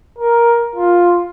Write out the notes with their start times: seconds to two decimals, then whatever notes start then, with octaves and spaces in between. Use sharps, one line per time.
0.19 A#4
0.76 F4